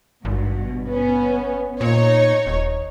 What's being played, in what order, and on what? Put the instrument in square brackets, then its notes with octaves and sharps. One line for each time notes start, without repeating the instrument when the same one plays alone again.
[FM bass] G#1 [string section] G2 B2
[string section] B3 C#4
[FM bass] A#2 [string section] D#4 C#5
[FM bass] D#1